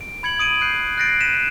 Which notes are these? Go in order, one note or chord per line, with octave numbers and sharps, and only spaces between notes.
D7
B5 G#6 C#7 F#7
D#6 D7 D#7
F#6 G6 C7
F#6 G6 A6 A#6 C7 D7
A#6 B6 D#7 E7